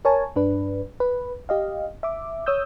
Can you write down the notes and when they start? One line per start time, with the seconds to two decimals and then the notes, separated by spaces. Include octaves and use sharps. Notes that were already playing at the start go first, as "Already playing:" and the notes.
0.05 A#4 C#5 G#5 A5
0.36 G2 D4 B4
1.00 B4
1.49 G4 D#5 F5
2.03 E5 D6
2.46 C#5 D#6 E6 G6